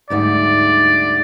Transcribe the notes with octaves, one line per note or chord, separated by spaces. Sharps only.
D2 G#2 G3 D5